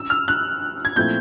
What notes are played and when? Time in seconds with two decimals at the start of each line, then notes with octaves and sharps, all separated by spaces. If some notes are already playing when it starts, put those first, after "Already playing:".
Already playing: C#4 E6
0.10 F6
0.28 F#6
0.85 G#6
0.96 A#2 F3 A3 C4 E4 G6